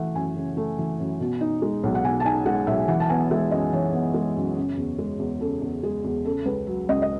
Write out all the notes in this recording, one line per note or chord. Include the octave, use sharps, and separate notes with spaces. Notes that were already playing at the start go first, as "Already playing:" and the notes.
Already playing: C#3 E3 A3 E5 F#5
F#2 G#5
C#3
A3
E3
F#2
B2
D#4
G#3
B1
F#5
B2 G#5
A5
D#4 G#5
G#3 F#5
B1 E5
E3 F#5
A5
B3 G#5
G#3 E5
F#2 D#5
E3 C#5
B3
G#3
F#2
C#3
E2
G#3
E2
C#3 A4
E2
G#3 G#4
E2
C#3 A4
C#2 B4
F#3
C#2 D#5
D#5